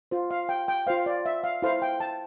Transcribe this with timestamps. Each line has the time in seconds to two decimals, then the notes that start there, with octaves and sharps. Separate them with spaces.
0.11 F4 C5
0.31 F5
0.49 G5
0.68 G5
0.87 F4 C5 F5
1.06 D5
1.26 E5
1.44 F5
1.62 E4 A4 C5 F5
1.82 G5
2.00 A5